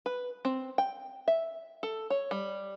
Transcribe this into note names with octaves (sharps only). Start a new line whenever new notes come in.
B4
C4
G5
E5
A4
C#5
G3